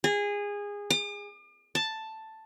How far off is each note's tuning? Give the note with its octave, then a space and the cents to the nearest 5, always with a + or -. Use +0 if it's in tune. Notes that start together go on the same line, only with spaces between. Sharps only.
G#4 -20
D6 +45
A5 +5